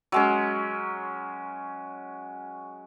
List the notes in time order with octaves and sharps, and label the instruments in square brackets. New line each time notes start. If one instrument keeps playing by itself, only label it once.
[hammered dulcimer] F#3 G#3 C#4